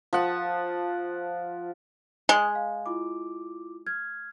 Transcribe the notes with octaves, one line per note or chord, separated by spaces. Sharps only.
F3 F#5
G#3 D#5 D#6
F5
E4 F4 D6
F6 G#6